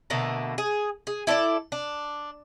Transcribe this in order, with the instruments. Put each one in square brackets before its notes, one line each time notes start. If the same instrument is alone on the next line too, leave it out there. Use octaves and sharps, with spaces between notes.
[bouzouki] B2 D3 A3 A#3
G#4
G#4
E4 A4 C#5 D5
D4